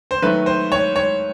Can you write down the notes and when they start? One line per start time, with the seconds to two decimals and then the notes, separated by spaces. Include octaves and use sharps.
0.11 C5
0.22 D#3 F#3 A3 B4
0.46 C5
0.72 C#5
0.96 C#5